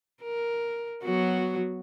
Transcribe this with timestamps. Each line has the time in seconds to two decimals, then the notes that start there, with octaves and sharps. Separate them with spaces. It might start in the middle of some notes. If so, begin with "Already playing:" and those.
0.23 A#4
1.04 F#3 B3 F#4